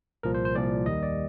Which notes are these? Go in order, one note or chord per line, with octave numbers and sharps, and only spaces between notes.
C2 A#2 F3 A#4
C5
C5
C2 A#2 F3 D5
D#2 D#3 G3 D#5
D5